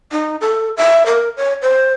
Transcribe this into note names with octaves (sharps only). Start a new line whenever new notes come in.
D#4
A4
E5
A#4
C#5
C5